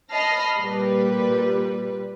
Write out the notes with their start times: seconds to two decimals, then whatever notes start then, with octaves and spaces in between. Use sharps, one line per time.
0.13 D#5 A5 B5 F6 A#6 C7
0.58 A#2 G3 B4